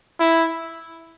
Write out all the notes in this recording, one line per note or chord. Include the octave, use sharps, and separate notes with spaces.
E4